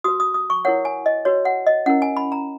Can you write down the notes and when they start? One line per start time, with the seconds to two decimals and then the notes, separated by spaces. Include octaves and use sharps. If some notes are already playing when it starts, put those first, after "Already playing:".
0.04 F#4 B4 D#6
0.20 D#6
0.34 D#6
0.50 C#6
0.65 E4 A#4 C#5 F#5
0.85 G#5
1.06 D#5
1.25 F#4 B4 C#5
1.45 F#5
1.66 D#5
1.86 C#4 E4 A#4 F#5
2.02 G#5
2.17 B5
2.32 A#5